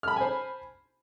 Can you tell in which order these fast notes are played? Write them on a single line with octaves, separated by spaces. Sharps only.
F6 B5 A5 G#5 C5